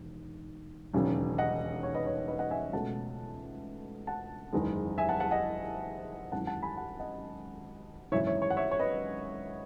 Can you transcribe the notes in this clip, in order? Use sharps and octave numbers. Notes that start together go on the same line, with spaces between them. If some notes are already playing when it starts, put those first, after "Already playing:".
Already playing: E1 D#2
E1 D#2 C#3 F#3 C#4
D#5 F#5
C#5
B4 D#5
C#5
B4 D#5
D#5 F#5
E5 G#5
C#2 B2 A3 F#5 A5
F#5 A5
F#1 E2 D#3 G#3
E5 G#5
F#5 A5
F#5 A5
D#5 F#5
G#1 F#2 E3 F#5 A5
F#5 A5
G#5 B5
F#5 A5
D#5 F#5
G#1 F#2 C#3 E3 C#5 E5
C#5 E5
C#5
F#5
C#5 E5
C#5
B4 D#5